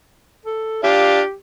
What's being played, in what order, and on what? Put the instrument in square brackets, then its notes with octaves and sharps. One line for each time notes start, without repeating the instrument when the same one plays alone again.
[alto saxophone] A4
[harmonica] D4 F4 F5 [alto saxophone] G4